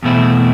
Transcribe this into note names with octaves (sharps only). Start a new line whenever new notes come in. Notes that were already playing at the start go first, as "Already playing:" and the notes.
E2 B2 A3 C4 E4